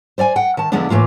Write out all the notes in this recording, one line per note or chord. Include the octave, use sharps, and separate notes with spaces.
C5 D5 F5 G#5
F#5 G5
D#3 A5
E2 D3 F3 G#3 B3 D4
A2 E3 A#3 F4